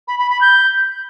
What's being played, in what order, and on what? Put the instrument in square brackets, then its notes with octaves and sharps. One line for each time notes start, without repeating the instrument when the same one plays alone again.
[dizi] B5
B5
B5
G6